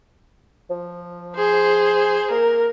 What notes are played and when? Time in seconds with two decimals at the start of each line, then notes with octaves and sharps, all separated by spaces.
0.70 F3
1.35 G#4 C5
2.31 A#3 A#4